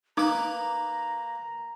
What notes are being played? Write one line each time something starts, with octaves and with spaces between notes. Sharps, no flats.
A#3 D#4 B4 A#5 D6 D#6